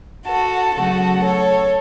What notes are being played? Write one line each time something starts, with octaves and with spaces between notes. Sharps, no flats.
F#4 A4
C#3 F#3 A3 F#4 A4
A4 C#5